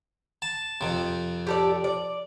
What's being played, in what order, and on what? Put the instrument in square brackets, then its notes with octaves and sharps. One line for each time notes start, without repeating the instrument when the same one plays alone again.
[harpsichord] A5
F2 C3
[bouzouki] G4 A4 D5
D5